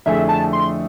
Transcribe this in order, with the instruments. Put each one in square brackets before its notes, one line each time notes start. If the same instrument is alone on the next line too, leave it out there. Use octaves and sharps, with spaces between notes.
[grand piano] F2 D3 A3 E4 G#4 [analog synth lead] E5
[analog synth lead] A5
C6